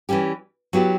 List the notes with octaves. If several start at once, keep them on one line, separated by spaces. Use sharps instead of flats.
E3 G3 C#4 G4
F#3 B3 E4 G4